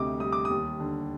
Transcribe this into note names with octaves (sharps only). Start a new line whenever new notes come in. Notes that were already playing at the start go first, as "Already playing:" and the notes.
Already playing: D2 C3 D#5 D6
G3 D#6
D6
D#2 D#6
D3